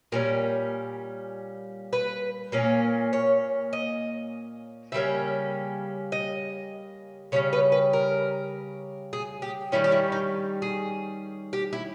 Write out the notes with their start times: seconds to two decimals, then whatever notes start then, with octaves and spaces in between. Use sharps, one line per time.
0.12 A#2 G3 C#4 A#4
1.93 B4
2.52 A#2 A#3 C#4
3.13 C#5
3.73 D#5
4.92 C#3 G3 A#3 C#4 E5
6.12 D#5
7.32 C#3 G3 C#4 C#5
7.53 B4
7.72 B4
7.93 A#4
9.13 G#4
9.42 G4
9.72 D#3 G3 C#4 E4
9.84 G4
9.92 E4
10.12 D#4
10.62 G#4
11.53 G4
11.73 E4